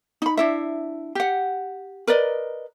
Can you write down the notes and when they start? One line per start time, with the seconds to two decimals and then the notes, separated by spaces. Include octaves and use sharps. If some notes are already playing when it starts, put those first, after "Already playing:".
0.22 D#4 B5
0.37 D4 E4 E5
1.15 G4 F#5
2.07 A#4 B4 D5 D#5